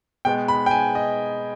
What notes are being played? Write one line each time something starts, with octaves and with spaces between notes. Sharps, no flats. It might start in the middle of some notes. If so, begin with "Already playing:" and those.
B2 G#3 B3 G5
B5
G5
G#5
D#5